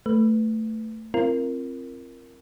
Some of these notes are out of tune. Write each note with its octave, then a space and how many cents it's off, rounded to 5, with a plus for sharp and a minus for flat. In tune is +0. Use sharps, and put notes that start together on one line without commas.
A3 +10 B4 +0
C4 +15 F4 -35 A#4 -5